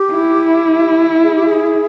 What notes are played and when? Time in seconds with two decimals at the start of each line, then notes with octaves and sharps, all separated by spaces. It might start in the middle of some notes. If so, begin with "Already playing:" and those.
Already playing: G4
0.12 E4
1.23 G#4
1.35 G4
1.46 G#4